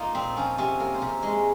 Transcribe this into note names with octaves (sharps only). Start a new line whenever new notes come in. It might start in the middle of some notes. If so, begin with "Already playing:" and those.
Already playing: A#3 D#4 F4 A#4
A#2 C4
F3 C#4
C3 C#4
A#3 A#4
C5
C3
A#4
G#3 C#4